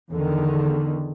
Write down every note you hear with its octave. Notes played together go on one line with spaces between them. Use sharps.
E2 D3 D#3